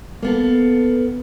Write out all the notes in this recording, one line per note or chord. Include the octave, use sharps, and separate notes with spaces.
A#3 B3 A4